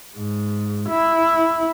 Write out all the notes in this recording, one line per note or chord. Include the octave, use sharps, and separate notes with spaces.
G#2
E4